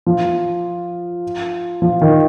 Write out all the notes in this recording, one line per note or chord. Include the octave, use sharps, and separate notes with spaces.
F3
F3
D#3